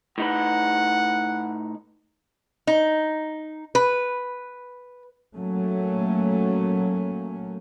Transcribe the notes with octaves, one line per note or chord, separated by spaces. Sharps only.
A2 D#4 B4 F#5
D#4
B4
F#3 A3 A#3 C#4